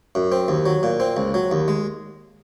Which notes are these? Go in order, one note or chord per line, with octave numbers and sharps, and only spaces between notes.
F#2
C4
D#2
F#3
A#2
C4
C#2
F#3
D#2
G#3